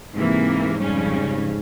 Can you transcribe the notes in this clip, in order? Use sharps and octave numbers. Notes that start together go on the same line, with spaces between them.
G#2 C3 E3 A#3
F2 C#3 G3 C#4